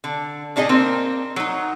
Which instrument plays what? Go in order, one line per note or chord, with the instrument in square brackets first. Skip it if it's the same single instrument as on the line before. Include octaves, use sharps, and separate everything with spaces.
[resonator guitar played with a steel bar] D3
A2 D4 D#4 G#4 D#5
A#3 C4 A#4
F#3 D#4